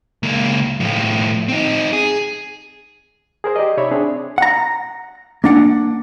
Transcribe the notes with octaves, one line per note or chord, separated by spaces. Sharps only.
C#2 A#3
A2 F3
C4 D#4
G#4
G#4 A#4 C5
G4 D5 D#5
C3 D#4 C#5 D5 E5 B5
C4 D4 G#4
F#5 A#5
A#3 D4 F#5